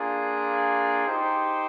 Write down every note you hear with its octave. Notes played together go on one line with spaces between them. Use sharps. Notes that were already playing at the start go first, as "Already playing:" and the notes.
Already playing: A#3 D4 F4 G#4
D#4 G4 C5